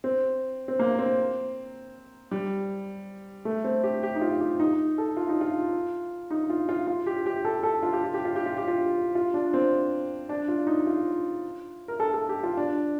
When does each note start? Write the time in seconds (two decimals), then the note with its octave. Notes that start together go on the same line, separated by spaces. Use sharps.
0.04 C4
0.68 C4
0.79 A#3
0.99 C4
2.31 G3
3.45 A3
3.64 C4
3.83 G4
4.03 G4
4.15 D#4
4.21 F4
4.40 G4
4.60 D#4
4.98 A4
5.17 F4
5.29 D#4
5.41 F4
6.31 D#4
6.50 F4
6.69 F4
6.87 F4
7.06 G4
7.26 G4
7.45 A4
7.63 A4
7.83 F4
7.93 G4
8.04 F4
8.14 G4
8.25 F4
8.36 G4
8.46 F4
8.57 G4
8.68 F4
9.15 F4
9.34 D4
9.54 C4
10.29 D4
10.48 F4
10.67 D#4
10.87 F4
11.88 A#4
12.00 A4
12.14 A4
12.29 G4
12.43 F4
12.57 D4